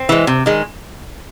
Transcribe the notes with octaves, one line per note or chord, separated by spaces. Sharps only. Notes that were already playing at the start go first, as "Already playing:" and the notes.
Already playing: C4
E3 G#3
C3
D#3 G#3